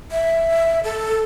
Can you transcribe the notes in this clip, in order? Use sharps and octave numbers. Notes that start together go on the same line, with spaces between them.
E5
A4